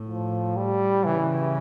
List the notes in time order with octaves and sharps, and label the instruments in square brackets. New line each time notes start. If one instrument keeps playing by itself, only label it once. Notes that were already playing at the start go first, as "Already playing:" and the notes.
Already playing: [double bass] A2
[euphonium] F3
G3
[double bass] C#3 [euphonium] E3